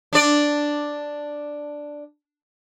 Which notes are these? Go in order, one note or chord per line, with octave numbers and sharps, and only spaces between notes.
D4 D5